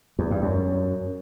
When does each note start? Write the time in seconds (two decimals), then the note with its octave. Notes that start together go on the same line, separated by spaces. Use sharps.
0.19 E2
0.31 G2
0.43 F#2